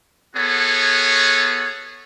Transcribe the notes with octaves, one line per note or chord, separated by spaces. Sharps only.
B3 F#4 G#4 A4 C#5